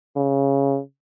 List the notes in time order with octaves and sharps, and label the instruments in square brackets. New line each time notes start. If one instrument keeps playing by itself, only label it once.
[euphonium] C#3